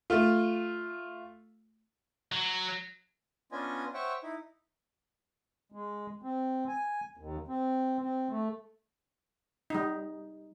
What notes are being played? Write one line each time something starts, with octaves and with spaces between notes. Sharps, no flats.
A3 F4
F#3
B3 C#4 D4 F4 D#5 G#5
C5 C#5 E5 F#5 G5 C#6
D#4 E4
G#3
C4
G#5
D#2
C4
C4
A3
G3 D#4